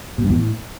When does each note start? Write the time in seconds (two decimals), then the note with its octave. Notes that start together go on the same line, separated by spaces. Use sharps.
0.18 B2
0.24 G2
0.29 E2
0.35 A2